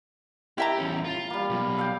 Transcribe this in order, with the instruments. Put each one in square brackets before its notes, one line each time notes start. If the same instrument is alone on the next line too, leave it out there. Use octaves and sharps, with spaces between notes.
[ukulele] E4 E5 A#5 [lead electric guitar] G4
[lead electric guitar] E2 C#4
F4
[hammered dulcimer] G3 A#3
[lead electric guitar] B2 F#3
[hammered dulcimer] A4 F5 G5